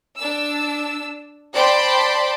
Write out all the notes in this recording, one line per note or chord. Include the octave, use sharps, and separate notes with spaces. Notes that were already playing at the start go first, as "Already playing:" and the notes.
D4 E6
C5 D5 G5 A5 B5 C6